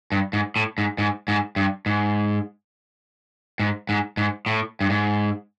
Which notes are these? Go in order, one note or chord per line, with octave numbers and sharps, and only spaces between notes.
G2
G#2
A2
G#2
G#2
G#2
G2
G#2
G#2
G#2
G#2
A2
G2
G#2